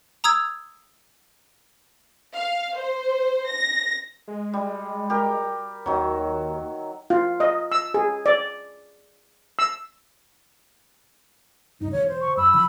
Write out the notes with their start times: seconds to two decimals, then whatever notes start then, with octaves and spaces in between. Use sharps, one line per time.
0.24 A#5 D#6 E6 G#6
2.36 F5
2.77 C5
3.49 A#6
4.28 G#3
4.54 G3
5.10 G4 A#4
5.86 D#2 D#3 F#3
7.10 F4
7.40 D#5
7.72 E6
7.94 G#4
8.26 D5
9.59 E6
11.81 C#2 G2 D#4
11.92 E1 D3 C#5
12.08 C5
12.21 C#6
12.37 F#2 B5 E6
12.54 D3 F3 B5